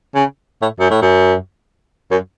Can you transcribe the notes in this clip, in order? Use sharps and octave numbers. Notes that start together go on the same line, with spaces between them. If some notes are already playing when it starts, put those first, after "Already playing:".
C#3
A2
F#2
A2
F#2
F#2